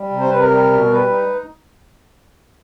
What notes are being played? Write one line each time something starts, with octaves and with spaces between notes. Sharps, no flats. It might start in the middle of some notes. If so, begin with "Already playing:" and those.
Already playing: G3
C3
C5
C3 B4
A#4
G3
B2
G3 B4
D#4